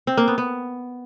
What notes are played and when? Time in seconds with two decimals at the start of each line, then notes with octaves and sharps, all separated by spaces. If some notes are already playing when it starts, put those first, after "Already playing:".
0.07 C4
0.17 A#3
0.28 B3
0.38 B3